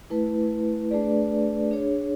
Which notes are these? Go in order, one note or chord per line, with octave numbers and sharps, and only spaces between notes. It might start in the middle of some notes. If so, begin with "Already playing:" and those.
A3 E4 B4
A3 D4 G#4 B4 D5
D4 G#4 C#5